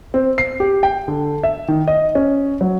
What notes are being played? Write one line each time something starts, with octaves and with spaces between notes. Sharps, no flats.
C4
C7
G4
G5
D3
E5
D#3
D#5
C#4
F#3